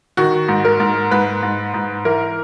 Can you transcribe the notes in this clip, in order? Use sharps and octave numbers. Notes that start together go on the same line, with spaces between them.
D#3 F#4
G#2
A#4
G#2
G#2 B4
G#2
G#2
E3 A#4